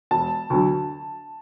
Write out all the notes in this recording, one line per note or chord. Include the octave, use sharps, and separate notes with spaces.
E1 A5
D2 D3 F#3